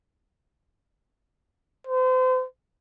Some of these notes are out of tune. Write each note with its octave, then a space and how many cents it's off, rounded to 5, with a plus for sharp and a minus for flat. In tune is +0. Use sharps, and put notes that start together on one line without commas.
C5 -35